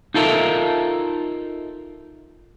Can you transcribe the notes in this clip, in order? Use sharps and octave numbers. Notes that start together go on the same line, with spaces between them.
D#4 F4 A4 A#4 E5